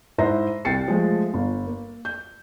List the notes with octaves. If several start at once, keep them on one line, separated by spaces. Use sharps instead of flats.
G#2 E4 C5 E5 A#5 A#6
C2 G5 A6 C7 C#7
F3 G#3 A3
G1
A#3
G6